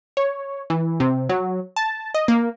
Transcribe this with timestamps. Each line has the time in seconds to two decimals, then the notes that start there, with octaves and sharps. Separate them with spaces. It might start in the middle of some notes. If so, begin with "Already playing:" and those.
0.17 C#5
0.70 E3
1.00 C3
1.29 F#3
1.76 A5
2.14 D#5
2.28 A#3